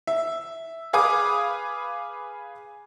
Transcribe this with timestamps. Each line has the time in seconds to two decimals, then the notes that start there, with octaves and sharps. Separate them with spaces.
0.07 E5
0.93 G#4 B4 F5 G#5 D6 D#6